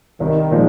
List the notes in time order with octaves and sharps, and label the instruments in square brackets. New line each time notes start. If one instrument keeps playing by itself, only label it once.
[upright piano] C2 [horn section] D#3
[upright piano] A#2 F3 G#3